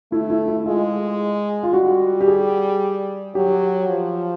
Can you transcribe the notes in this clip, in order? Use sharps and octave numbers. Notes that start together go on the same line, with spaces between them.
A3 E4
E4
E4
G#3 F4
F4
G3 F#4
G4
G#4
F#3 G4
F3